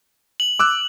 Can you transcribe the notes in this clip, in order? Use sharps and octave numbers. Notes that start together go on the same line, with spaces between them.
F#7
D6 E6 F#6